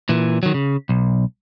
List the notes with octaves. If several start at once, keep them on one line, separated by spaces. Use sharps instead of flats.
A#2 E3
D#3 F#3
C#3
B1